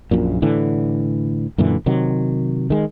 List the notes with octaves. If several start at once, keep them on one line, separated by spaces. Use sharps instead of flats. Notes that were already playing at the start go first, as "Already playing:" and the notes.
A#1 F#2 A#2
A2 D3 E3
F#2 A#2 D3 E3
C3 D#3 F#3
D#3 G#3